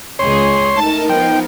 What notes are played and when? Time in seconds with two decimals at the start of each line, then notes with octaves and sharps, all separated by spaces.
0.19 C#2 G#4 C#5 C6
0.74 A3 D#4 A#4 A5
1.10 F3 B3 G5